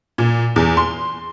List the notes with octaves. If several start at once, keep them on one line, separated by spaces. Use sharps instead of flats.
A#2
E2
C6